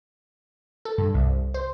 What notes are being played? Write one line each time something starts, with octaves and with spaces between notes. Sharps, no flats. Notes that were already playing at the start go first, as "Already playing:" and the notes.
A4
G2
C2
C5